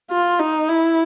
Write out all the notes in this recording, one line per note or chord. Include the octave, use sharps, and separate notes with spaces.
F4
D#4
E4